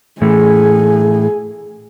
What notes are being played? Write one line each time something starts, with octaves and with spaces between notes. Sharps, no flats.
A2 E3 A3 G#4